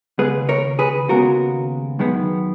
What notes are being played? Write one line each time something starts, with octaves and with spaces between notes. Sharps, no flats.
D#2 C#3 G#3 B3 G#4 B4
A#4 C#5
G#4 B4
D#2 C#3 G#3 B3 F#4 A#4
F#2 D#3 G#3 B3